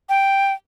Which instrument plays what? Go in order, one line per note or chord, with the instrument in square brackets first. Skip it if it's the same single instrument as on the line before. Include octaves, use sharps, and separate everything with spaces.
[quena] G5